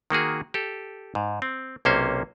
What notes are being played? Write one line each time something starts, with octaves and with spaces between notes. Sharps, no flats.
D#3 A#3 F#4 G#4
G4 A4
G#2
C4
B1 C3 A#3 C#4 C5